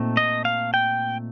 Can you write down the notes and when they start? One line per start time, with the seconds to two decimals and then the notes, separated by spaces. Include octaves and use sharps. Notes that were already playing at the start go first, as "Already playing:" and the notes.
Already playing: A#2 A3 C4 D#4
0.17 D#5
0.45 F5
0.74 G5